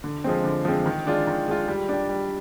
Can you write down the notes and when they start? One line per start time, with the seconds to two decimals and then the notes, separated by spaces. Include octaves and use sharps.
0.04 D3
0.24 F3 G#3 C4
0.44 D3
0.65 F3 G#3 C4
0.86 D#3
1.06 G#3 D4 F4
1.27 D#3
1.48 G#3 D4 F4
1.68 G3
1.89 D4 G4
2.09 G3